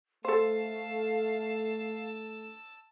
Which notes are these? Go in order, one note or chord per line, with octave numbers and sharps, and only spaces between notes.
A3 A4 C5 F5 A5 E6